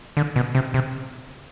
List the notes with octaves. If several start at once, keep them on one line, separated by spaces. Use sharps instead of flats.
D3
B2
C3
C3